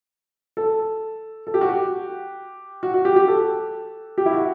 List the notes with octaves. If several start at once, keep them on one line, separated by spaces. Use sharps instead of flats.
A4
A4
G4
F#4
G4
F#4
F#4
G4
G4
A4
G4
E4
F#4